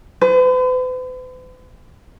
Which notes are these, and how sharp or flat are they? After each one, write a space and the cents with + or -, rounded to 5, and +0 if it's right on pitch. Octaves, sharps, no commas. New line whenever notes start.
B4 +45